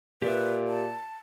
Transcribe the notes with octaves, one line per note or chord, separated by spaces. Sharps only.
A#2 G4 B4 D5 E5
A5